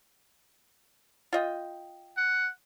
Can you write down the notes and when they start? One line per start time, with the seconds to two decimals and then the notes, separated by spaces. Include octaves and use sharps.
1.33 F4 D#5 G5
2.17 F#5